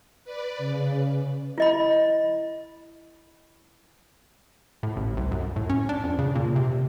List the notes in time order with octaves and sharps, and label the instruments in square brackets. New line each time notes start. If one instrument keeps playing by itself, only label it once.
[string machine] B4 D5
C#3
[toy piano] E4 D#5 B5
[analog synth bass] A2
A1
C2
F#2
A2
C#4
D4
F2
C#3
A#2
C3